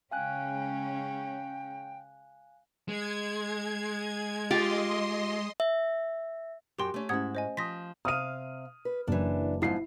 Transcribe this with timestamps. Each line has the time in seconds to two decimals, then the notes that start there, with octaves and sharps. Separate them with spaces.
0.11 C#3 G#3 C#4 F5 G5 G#5 F#6
2.88 G#3 G#6
4.51 F4 G4 D#5 C6
5.60 E5
6.78 F#2 G4 G5 C6
6.94 A3 C#4
7.09 G#2 A3 C#4 E4 G4 F#5 D#6 G#6
7.35 C5 D#5 G#5
7.57 F3 C6 D#6 A#6 B6
8.05 C3 F5 D#6 F6 D#7
8.85 B4
9.07 F#1 F#2 E3 D4
9.62 F2 G#2 E4 C7